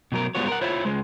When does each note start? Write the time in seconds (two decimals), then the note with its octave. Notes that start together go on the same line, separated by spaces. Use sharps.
0.12 B2 F#3 A#4
0.35 G3 G#3 B3 F4 F#4 C#5
0.48 A#4 F#5
0.61 E4 F4 C5 C#5 E5
0.85 C#2 G#3